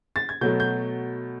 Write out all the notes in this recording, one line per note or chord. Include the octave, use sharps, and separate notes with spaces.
A6
G#6
B2 F#3 A3 G6
G6